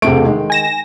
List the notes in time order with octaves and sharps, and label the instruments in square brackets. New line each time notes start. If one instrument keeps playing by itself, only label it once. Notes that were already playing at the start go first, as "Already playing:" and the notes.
[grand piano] E1 C3 D7 [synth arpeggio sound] A3
[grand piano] D#3 G#3
[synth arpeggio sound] G#5 A#6 E7